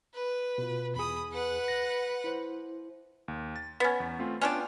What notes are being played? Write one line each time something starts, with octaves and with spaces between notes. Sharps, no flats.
B4
B2 F4
E2 G#4 B5 D#6
B4 F#5
A#6
E4 C5
D#2
A6
B3 C#4
E2
A3 C4 F4
B3 C#4 D4 F4 D5 G5